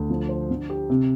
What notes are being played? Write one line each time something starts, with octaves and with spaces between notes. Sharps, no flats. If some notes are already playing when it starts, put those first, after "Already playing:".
Already playing: D2
F3
C5
D3
G4
C3